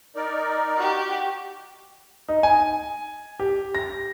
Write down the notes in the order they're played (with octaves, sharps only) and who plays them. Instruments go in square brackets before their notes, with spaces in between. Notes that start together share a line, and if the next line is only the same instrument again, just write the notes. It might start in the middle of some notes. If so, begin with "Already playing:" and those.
[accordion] D#4 A#4 D5
[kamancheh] F#4 G4
[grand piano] D#4
G#5
G4
A#6